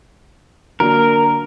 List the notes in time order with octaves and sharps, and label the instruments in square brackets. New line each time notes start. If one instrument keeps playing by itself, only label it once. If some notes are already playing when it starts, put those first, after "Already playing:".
[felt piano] D3 F#3 A#3 D4 F#4 [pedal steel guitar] A#4